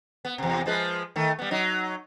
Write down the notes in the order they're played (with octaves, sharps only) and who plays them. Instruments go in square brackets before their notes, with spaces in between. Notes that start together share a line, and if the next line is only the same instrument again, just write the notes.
[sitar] B3
E2 C3
F3 G#3 B4
D#3 A3
G3 B3
F#3 D#4